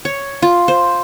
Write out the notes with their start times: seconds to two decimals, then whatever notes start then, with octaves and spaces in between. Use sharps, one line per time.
0.05 C#5
0.42 F4
0.68 C5